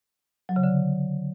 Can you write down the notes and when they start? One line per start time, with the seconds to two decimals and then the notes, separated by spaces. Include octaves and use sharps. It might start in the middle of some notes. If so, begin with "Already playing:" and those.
0.49 F#3
0.56 C#3
0.64 D3